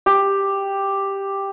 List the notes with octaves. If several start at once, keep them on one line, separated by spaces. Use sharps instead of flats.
G4